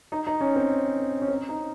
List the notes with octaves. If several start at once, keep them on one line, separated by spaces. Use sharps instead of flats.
D#4
D#4
C#4
C4
C#4
C4
D#4